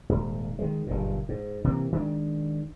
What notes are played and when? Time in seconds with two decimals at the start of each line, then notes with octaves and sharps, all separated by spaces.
0.09 D#1 G#2
0.59 D#3 G#3
0.87 F#1 G2 A#2
1.29 G#2
1.64 C3 E3 A#3
1.92 D#3 G#3 D4